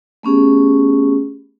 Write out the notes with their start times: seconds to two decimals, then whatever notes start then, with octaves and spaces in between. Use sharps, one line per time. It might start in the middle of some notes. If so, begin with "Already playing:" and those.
0.23 A3 B3 C#4 G4 G#4